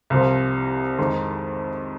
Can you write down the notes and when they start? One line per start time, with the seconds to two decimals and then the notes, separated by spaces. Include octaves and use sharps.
0.10 C2 C3 F3
0.99 F2 D#3 G#3